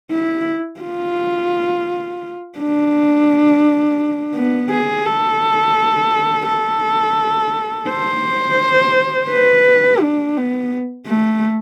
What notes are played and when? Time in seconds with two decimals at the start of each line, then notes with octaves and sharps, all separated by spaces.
0.11 E4
0.81 F4
2.58 D4
4.35 B3
4.71 G#4
5.06 A4
6.48 A4
7.89 C5
9.30 B4
10.02 D4
10.38 B3
11.08 A3